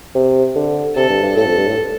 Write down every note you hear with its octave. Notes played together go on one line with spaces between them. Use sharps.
C3
D3
C3 A4
G2
G2
A2 A4
F2
G2
A2